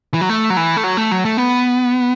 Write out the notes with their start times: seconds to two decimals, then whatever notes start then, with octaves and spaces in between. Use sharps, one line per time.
0.14 E3
0.21 F#3
0.29 A3
0.50 F#3
0.57 E3
0.77 A3
0.84 F#3
0.97 A3
1.11 F#3
1.25 A3
1.37 B3